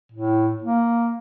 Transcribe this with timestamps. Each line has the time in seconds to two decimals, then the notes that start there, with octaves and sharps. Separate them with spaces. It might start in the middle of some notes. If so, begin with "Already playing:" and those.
0.12 A2
0.62 A#3